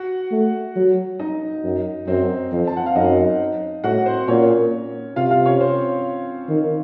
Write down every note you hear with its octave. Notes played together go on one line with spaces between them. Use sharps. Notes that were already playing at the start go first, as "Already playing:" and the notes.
Already playing: F#4 F#5
A3
F#3
D#4 D#5
F#2
F#2 C4 C5
F2
A5
F#5
F5
F#2 D#4 D#5
A2 F#4 F#5
C4 C5
A#2 C#4 C#5
C3 F4 F5
F4 F5
C#4 C#5
C4 C5
D#3